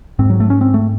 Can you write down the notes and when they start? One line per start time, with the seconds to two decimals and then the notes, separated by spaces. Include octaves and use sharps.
0.19 G#2 C4
0.30 F#3
0.40 A3
0.50 C#4
0.61 C4
0.74 A3